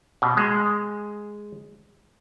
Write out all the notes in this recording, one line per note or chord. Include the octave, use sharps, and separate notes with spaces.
B2
G#3